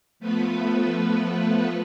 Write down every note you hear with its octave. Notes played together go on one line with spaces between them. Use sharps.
F3 A3 B3 B4